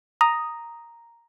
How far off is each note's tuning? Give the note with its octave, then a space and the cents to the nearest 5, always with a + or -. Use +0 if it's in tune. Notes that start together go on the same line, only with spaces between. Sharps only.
A#5 +0 D#6 +0